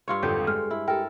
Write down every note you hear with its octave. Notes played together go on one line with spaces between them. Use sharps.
G2 F4 C#5
G#1 F2 D3 G4 A4
G#3 F6
E4
G4 A4 A#4 G5